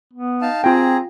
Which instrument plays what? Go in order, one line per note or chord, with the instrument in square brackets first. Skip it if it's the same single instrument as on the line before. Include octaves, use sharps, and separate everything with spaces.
[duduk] B3
[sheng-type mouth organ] D#4 F5 A5
[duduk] C4 [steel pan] F4 G5 [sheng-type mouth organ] G#4 A#5